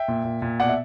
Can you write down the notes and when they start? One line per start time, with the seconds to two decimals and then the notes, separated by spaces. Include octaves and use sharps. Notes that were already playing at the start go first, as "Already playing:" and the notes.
Already playing: E5 G5
0.08 A#2
0.24 A#2
0.42 A#2
0.60 B2 D5 F#5
0.69 E5